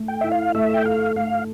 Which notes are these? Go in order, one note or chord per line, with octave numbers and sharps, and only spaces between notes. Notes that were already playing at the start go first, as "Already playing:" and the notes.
Already playing: A3 A4
G5
E4 E5
F5
A3 E5
G5
A4 F5
A3 F5